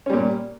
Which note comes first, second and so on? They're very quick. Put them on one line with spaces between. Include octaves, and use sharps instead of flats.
C#4 G3 A#2